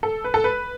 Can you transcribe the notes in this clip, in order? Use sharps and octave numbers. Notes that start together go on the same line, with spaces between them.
A4
B4
A4
B4